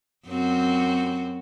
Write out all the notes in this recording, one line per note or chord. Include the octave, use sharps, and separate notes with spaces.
F#2 C4 F#4